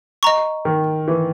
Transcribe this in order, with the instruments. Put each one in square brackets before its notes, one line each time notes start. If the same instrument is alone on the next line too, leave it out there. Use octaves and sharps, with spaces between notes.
[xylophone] D#5 A#5 C#6
[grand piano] D#3
E3